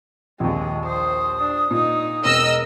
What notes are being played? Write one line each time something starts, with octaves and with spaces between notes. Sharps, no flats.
A#1 D#2 G#3
C5 D#6
D4
A#2 D#4
E1 A#4 D#5 E6